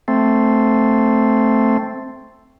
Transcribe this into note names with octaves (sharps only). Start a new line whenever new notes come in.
A3 C4